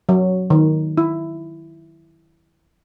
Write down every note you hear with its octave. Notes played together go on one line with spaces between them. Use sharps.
F#3
D#3
E4